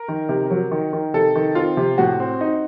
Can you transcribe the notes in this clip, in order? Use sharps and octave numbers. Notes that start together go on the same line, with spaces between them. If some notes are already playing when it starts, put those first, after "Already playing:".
Already playing: A#4
D#3
C3
F#3
D#3
D#3
C3 A4
D#3
C4 F4
C3
A2 F#4
C4
D#4